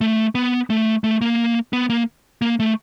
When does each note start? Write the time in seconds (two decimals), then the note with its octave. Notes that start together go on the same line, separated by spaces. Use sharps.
0.01 A3
0.35 B3
0.70 A3
1.04 A3
1.21 A#3
1.73 B3
1.90 A#3
2.42 A#3
2.60 A3